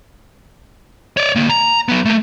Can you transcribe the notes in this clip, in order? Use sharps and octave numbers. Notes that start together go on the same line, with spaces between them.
C#5 D5
D2 A#3
A#5
F#3 B3
A3 A#3